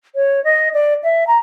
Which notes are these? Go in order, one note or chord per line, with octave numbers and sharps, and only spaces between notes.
C#5
D#5
D5
E5
A#5